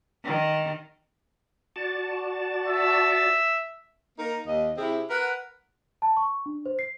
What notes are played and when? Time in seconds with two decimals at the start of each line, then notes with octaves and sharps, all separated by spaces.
0.25 D#3
1.76 F#4 D5 A5
2.68 E5
4.19 A#3 D#4 A#4
4.47 D#2 D#5
4.78 C3 C4 E4 G4 G#4
5.10 A#4 B4 F#5
6.02 A5
6.17 C#6
6.46 D4
6.66 C5
6.79 C7